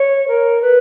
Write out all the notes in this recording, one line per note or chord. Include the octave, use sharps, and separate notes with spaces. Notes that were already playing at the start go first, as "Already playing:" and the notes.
Already playing: C#5
A#4
B4